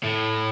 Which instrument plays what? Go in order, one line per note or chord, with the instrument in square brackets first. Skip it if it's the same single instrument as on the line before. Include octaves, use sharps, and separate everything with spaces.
[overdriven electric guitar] A2